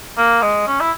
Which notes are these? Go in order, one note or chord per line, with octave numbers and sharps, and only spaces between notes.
A#3
G#3
C#4
E4